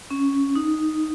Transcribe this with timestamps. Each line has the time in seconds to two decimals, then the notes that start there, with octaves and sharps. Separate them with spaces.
0.11 C#4
0.55 D#4